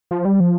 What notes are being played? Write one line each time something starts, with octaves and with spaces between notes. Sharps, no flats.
F3
G3
F3